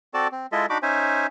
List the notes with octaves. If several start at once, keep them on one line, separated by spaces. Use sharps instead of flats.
C4 F#4 A4 D5 A5
C4
G#3 E4 F4 A4 D#5 E5
D4 D#4 F#4 B5 D6
C#4 D#4 C5 E5 G#5